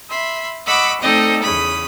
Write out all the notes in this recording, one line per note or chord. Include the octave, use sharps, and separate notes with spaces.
E5 B5 C6
D#5 F#5 B5 C#6 D6 E6
A3 C4 D#4 A4 D5 D#5
E2 C#3 B5 D#6